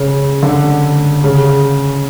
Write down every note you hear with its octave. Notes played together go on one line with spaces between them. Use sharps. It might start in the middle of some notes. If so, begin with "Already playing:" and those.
Already playing: C#3
D3
C#3